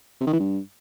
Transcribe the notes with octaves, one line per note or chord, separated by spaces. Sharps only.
C3
D#3
E3
G2